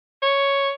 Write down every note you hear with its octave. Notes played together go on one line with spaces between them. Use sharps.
C#5